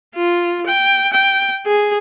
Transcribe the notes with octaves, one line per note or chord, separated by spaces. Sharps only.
F4
G5
G5
G#4